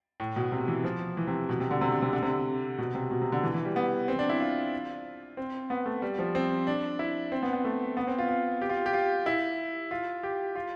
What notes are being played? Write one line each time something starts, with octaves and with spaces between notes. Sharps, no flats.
A2
B2
C3
E3
F3
E3
C3
B2
C3
D3
C3
D3
C3
D3
C3
B2
C3
B2
C3
D3
E3
E3
G3
B3
C4
D4
E4
F4
C4
B3
A3
G3
F3
C4
D4
E4
C4
B3
B3
A3
B3
C4
F4
F4
G4
F4
G4
F4
E4
F4
G4
F4